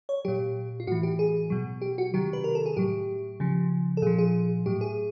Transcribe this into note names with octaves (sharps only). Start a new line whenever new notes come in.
C#5
A#2 F#3 G4
F4
A2 E3 F#4
G4
G#4
B2 F#3
G4
F#4
C3 D#3 F#3 G4
B4
A#4
A4
G#4
A2 F#3 G4
C#3 F3
A4
A#2 F3 G#4
G#4
A2 F#3 G4
G#4